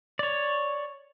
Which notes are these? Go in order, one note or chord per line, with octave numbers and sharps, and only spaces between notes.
C#5 D5